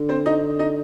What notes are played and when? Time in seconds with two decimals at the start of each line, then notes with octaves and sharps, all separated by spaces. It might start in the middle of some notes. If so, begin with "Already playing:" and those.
Already playing: D3
0.09 C4 C5
0.26 D#4 D#5
0.59 D#4 D#5